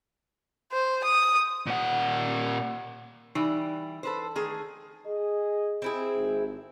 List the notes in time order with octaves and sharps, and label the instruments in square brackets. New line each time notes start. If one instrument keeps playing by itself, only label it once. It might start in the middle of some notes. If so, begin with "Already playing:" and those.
[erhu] C5
D#6
[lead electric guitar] A#2 F#5
[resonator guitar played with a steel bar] E3 G3 G5 [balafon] D#4
[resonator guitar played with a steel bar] A4 B4 C5
D#3 A3 G#4
[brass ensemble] G#4 D#5
[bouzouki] C4 E4 G#4
[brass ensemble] G#1